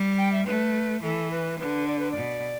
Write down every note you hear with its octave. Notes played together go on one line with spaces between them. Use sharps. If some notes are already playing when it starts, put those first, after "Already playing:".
Already playing: G3
G5
E5
A3 B4
E3 A4
B4
D3 B4
D5
B4
D5
B2